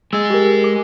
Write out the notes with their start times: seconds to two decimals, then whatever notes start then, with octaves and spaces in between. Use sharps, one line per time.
0.13 G#3 G#4 E6 A6
0.30 G4 A#4
0.64 D6